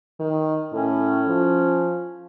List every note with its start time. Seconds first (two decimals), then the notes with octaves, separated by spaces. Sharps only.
0.20 D#3
0.73 A2 C#4
1.28 F3